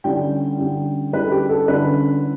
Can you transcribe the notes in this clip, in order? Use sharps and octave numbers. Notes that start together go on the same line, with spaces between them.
D3 G3 C#4 E4 G5
D3 G3 C#4 E4
D3 G3 C#4 E4 B4
A4
G4
A4
D3 G3 C#4 E4 B4